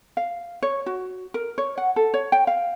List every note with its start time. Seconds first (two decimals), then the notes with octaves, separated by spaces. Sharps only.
0.17 F5
0.63 C#5
0.86 F#4
1.34 A#4
1.58 C#5
1.78 F#5
1.96 A4
2.14 C#5
2.32 G5
2.47 F5